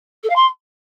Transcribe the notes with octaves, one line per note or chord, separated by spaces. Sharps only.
A4
F5
C6